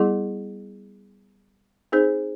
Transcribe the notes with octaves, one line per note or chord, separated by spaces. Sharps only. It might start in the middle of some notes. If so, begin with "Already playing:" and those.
Already playing: G3 B3 E4 G#4
C4 D#4 G#4 C5